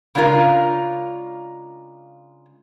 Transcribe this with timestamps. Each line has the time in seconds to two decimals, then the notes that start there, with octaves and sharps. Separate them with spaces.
0.15 C#3 G#3 D4 F4 A#4